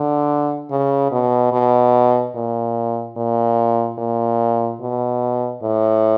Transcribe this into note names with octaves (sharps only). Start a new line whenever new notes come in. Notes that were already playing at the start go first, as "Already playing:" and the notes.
Already playing: D3
C#3
B2
B2
A#2
A#2
A#2
B2
A2